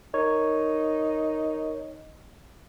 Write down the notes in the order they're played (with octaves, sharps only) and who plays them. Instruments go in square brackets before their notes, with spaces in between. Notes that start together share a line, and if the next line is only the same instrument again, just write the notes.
[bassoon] D#4 [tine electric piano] A#4 C#5